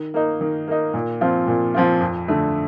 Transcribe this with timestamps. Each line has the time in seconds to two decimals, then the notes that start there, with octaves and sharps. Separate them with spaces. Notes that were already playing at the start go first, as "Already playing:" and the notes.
Already playing: D#3
0.14 A#3 D#4
0.41 D#3
0.68 A#3 D#4
0.94 A#2
1.21 F3 C4 F4
1.48 A#2
1.74 F3 C4 F4
2.00 F2
2.28 D3 A3